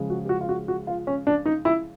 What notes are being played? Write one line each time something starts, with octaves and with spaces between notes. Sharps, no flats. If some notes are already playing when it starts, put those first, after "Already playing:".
Already playing: C#3 F3 G#3
F#4
G4
F#4
F4
F#4
F#4
F4
C#4
D4
D#4
E4